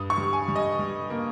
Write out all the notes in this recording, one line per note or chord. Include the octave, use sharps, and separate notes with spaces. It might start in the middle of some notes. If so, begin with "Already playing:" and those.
Already playing: G2 D#6
C#6
G3
G#5
G3
D#5
G3
A#3